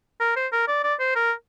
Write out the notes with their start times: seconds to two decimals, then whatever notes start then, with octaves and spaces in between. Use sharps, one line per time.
0.20 A#4
0.36 C5
0.52 A#4
0.68 D5
0.83 D5
1.00 C5
1.15 A#4